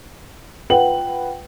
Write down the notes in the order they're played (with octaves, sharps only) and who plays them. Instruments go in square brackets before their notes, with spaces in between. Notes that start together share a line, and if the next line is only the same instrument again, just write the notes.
[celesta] F4 G5 [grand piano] B4 F#5 F#7